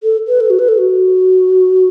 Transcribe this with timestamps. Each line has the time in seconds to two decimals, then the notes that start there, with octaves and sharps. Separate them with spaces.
0.03 A4
0.28 B4
0.40 A4
0.50 F#4
0.59 B4
0.69 A4
0.78 F#4